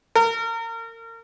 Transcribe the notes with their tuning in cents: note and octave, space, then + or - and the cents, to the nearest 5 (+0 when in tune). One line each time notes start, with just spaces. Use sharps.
A#4 -30